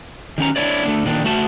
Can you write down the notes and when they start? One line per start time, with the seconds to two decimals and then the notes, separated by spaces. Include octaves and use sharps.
0.38 D#3 C#4 A#5
0.56 D4 E4 C#5 D5
0.84 A3 C4 D4
1.05 A#2 D#3 D4
1.24 A3 F#4 A5